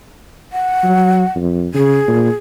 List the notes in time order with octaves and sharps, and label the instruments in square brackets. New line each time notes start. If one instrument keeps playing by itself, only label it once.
[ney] F#5
[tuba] F#3
F2
[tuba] C#3 [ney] G#4
[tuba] A#2